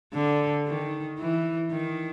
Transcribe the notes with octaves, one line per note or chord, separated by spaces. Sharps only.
D3
D#3
E3
D#3